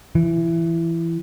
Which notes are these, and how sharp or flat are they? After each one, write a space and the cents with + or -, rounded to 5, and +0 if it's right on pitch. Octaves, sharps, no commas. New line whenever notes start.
E3 +15